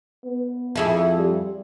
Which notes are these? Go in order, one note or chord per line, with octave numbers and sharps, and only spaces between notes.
B3
F2 E4 G#4
G3